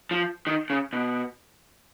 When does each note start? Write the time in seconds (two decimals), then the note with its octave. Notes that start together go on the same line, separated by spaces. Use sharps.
0.11 F3
0.47 D#3
0.70 C#3
0.93 B2